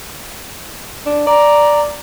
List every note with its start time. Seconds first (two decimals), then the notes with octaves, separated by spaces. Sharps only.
1.06 D4
1.27 D5 A#5